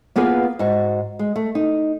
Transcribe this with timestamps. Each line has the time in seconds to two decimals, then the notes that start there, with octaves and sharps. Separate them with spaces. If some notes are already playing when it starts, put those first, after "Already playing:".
0.16 A#3 B3 F4 G#4 B4
0.59 G#2 F#4
1.19 G#3
1.36 A3
1.55 D#4